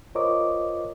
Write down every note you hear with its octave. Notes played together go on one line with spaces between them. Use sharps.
F4 A#4 C5 C#5 D#5 D6